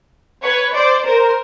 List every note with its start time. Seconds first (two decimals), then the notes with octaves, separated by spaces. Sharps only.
0.42 B4 C#5
0.73 C5 D5
1.04 A#4 C5